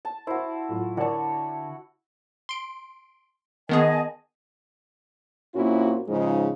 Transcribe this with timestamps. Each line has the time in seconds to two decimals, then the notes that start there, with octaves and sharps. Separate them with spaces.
0.05 A5
0.27 E4 F#4 C5
0.69 A2 F#3 F4
0.97 D3 E4 F#4 A#4 C#5 D5 A5
2.49 C6 D7
3.69 D#3 B3 G#4 D#5 G#5 A5
5.55 A#2 C4 C#4 E4 F#4
6.08 G#2 C#3 F3 G#3 D#4